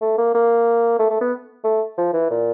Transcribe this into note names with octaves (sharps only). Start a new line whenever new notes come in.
A3
A#3
A#3
A3
A3
B3
A3
F3
E3
A#2